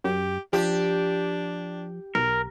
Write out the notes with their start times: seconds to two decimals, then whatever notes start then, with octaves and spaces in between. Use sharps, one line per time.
0.04 F#2 G4
0.53 F3 D4 G4
2.15 B1 A#4